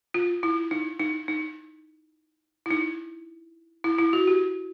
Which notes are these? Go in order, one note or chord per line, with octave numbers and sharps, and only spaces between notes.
F4
E4
D#4
D#4
D#4
E4
D#4
E4
E4
F#4
G4